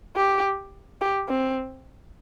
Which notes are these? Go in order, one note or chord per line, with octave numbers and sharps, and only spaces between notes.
G4
G4
C4